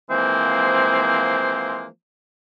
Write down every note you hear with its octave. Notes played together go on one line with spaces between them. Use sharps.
E3 F3 G#3 A#3 C4 C5